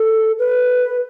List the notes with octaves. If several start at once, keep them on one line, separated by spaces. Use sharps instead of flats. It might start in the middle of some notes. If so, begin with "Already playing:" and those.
Already playing: A4
B4